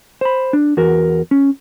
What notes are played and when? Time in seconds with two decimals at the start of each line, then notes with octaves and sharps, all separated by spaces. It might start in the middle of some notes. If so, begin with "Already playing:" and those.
0.21 C5 B5
0.53 D4
0.77 E2 F#4 A#4
1.31 C#4